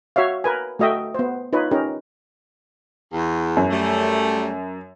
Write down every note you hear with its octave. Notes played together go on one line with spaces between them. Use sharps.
F#4 C#5 E5 F5
A#4 B4 G#5
A3 F#4 D#5 E5 G5
B3 C5
D#4 F4 B4 C#5
C#4 D#4 G4 A#4
E2
F#2
G3 A3